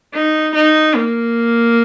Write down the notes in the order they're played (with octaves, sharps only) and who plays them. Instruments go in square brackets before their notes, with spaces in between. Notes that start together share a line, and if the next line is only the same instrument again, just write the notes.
[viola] D#4
D#4
A#3